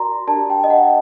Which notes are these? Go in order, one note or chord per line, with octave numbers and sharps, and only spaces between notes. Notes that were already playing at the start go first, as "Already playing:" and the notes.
Already playing: F#4 A#4 D5 A#5 C6
D4 G4 A#4 D5 A5
G5
D#5
F#5